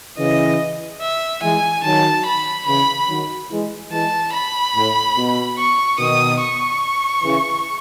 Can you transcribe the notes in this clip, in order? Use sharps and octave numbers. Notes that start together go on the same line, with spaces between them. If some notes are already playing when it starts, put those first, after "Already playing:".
C#3 E3 D#5
E5
E3 G#3 G#5
D#3 F#3 A5
B5
C#3 E3 B5
D#3 F#3
E3 G#3
E3 G#3 A5
B5
A2
B2
C#6
B2 D#3 D#6
C#6
C#3 E3